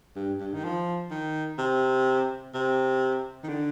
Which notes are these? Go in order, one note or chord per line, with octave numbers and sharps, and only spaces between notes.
G2
G2
D#3
F3
D#3
C3
C3
D#3
D3